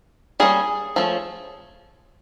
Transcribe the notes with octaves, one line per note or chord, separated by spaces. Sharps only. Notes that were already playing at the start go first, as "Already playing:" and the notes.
G3 A#3 C#4 G#4
F3 A3 C#4